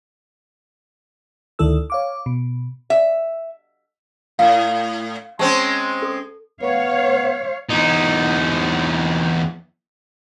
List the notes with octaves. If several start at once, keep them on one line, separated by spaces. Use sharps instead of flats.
D2 D#3 E4 A4 E6
C#5 F5 D6
B2
E5
A2 F5
G#3 C4 C#4 A5 C#6
A4
B3 C#5 F5
E2 D#4